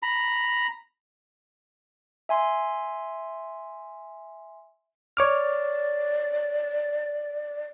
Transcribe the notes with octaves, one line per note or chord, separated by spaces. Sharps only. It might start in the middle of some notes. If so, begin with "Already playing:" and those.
A#5 B5
E5 G#5 C6
C#5 D5 D6 F6